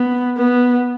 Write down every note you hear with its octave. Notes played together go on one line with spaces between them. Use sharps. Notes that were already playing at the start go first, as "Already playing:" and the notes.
Already playing: B3
B3